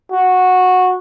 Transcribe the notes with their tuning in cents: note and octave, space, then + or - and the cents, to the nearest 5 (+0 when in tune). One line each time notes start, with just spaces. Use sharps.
F#4 -10